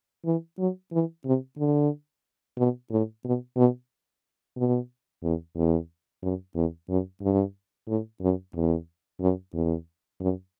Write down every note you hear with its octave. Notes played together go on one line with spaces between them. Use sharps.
E3
F#3
E3
C3
D3
B2
A2
B2
B2
B2
E2
E2
F#2
E2
F#2
G2
A2
F#2
E2
F#2
E2
F#2